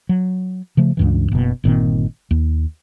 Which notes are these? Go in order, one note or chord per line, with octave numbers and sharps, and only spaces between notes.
F#3
C#3 F3 A3
C#2 G2 E3
F#1 B2
G1 A#2 D#3 C4
D#2